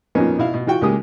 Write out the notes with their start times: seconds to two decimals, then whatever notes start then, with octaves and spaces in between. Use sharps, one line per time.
0.15 F2 A#2 A#3 B3 C#4 D#4
0.38 B2 E4 F5
0.54 B2
0.67 E3 F4 F#4 G5
0.82 C#2 G#3 A#3 G4 D#6